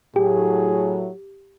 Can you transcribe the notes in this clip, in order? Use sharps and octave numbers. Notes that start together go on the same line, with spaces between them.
A2 F#3 G4 G#4